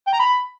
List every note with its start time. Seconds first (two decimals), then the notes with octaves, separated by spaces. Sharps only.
0.07 G5
0.13 A#5
0.19 B5